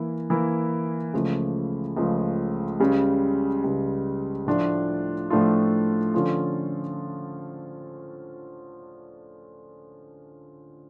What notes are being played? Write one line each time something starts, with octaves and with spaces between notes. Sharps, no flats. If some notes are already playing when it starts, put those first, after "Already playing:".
Already playing: E3 A#3 E4
E3 A#3 E4
C#2 C#3 F3 A3
C#2 C#3 F3 A3
C#2 C#3 G3
C#2 C#3 G3
A2 F3 A3 D4 F4
A2 F3 A3 D4 F4
D3 F3 C#4 F4 A4